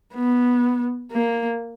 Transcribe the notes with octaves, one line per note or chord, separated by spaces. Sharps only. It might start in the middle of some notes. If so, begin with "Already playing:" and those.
B3
A#3